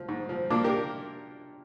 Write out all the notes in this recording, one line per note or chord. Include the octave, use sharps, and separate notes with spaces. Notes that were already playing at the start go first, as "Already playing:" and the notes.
Already playing: F3
G#2
F3
A#2 A#3 D4
G4 A#4